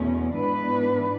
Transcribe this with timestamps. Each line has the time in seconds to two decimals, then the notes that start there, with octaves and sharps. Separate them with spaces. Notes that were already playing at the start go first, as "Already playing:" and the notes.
Already playing: E2 B2 A3 C#4
0.35 G#2 E3 B3 D4 B4